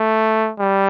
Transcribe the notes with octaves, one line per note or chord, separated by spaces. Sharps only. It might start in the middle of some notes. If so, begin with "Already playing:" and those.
Already playing: A3
G3